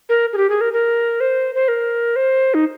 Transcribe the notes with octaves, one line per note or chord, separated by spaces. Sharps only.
A#4
G#4
G4
G#4
A#4
A#4
C5
C5
A#4
C5
D#4